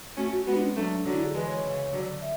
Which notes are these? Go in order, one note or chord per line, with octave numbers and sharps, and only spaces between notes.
A3 C#4 F#4
F#4
G#3 B3 F#4
D4
C#4
F#3 A3 D4
D3 F#3 D4
E4
G#4
E3 G#3 B4
C#5
C#3 E3
D3 F#3
E5